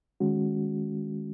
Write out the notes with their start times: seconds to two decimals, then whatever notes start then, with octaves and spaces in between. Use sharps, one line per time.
0.20 D#3 G#3 C#4 F#4